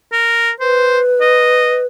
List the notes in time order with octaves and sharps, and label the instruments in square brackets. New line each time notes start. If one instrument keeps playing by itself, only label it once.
[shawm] A#4
[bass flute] B4 [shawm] C5
[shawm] D#5